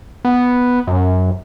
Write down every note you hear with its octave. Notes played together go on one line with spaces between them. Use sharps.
B3
F#2